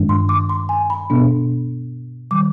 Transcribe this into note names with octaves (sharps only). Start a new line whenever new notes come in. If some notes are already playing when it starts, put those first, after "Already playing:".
Already playing: G2 D#3 G#3 D4
C6
D6
C6
G#5
B5
B2 B3 D4
D#3 G3 D6